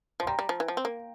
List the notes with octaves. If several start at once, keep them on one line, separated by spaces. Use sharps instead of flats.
F3
C6
G3 G5 A#5
G3
F3
E3
F3
C4
A#3